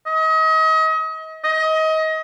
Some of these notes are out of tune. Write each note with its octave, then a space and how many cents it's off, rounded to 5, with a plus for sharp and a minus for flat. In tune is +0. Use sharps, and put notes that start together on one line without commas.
D#5 +35
D#5 +25